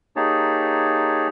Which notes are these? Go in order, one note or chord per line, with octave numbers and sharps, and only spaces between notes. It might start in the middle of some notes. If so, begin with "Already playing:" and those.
A#3 D#4 G4 G#4 C#5 A5